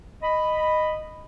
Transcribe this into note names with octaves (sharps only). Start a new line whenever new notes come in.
D#5 B5